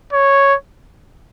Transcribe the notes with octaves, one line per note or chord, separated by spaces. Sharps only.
C#5